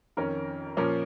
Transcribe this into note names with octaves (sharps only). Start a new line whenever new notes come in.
F2 D#3 C#4 A#4
A#2 F3 C#4 A#4